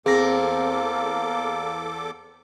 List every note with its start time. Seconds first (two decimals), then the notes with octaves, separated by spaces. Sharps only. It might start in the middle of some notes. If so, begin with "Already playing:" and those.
0.06 E2 A#3 C4 G#4 A4 D6 A#6